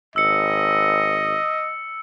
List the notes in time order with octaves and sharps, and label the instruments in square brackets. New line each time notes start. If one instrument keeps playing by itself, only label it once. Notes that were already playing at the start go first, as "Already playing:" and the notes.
[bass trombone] G#1 [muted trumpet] D#5 [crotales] E6 C#7